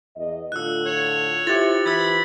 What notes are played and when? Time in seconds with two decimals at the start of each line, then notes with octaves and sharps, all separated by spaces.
0.16 E2 D#5
0.52 A2 D3 F4 E6 F#6
0.86 C#5
1.47 E4 F4 G4 C5 A6
1.86 E3 C5 B5 E6 G#6